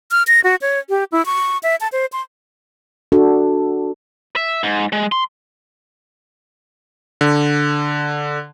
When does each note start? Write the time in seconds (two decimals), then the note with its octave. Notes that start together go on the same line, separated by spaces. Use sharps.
0.11 F6
0.27 A#6
0.44 F#4
0.62 C#5
0.90 G4
1.12 E4
1.26 C#6
1.63 E5
1.81 A5
1.92 C5
2.13 C6
3.12 D4 F#4 A4
4.36 E5
4.63 G#2
4.93 G#3
5.12 C6
7.21 D3